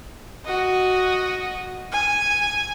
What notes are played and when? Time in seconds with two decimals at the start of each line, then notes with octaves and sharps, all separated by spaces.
0.45 F#4 D#5
1.92 G#5